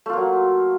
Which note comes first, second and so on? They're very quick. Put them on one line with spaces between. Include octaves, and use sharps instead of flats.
A3 F4 A#3 F#3